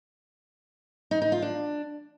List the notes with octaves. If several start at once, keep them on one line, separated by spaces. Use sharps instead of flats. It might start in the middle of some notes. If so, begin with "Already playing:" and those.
D#4
D#4
F4
D4